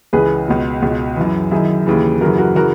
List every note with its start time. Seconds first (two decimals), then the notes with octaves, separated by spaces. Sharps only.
0.13 C#2 C#3 E3 G#4 B4
0.48 C#2 B2
0.82 C#2 B2
1.17 F#2 E3
1.51 F#2 D#3 E4 G#4
1.86 D#2 C#3 E3
2.21 F#2 C#3 E3 F#4 A#4
2.38 F#4 A#4
2.56 C#3 E3 F#4 A#4